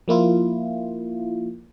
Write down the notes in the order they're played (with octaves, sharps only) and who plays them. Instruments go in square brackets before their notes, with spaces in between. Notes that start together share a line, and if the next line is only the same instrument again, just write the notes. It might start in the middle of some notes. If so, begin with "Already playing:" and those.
[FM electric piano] F3 A#3 E4 F4